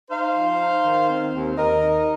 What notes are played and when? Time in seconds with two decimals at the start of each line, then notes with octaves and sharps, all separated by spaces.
0.10 D#4 C5 F5
0.34 F3
0.60 D#4
0.83 D#3
1.09 C4
1.33 D#2
1.57 D#2 A#4 D#5
1.81 D#4